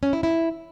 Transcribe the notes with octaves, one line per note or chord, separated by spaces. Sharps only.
C#4
E4
E4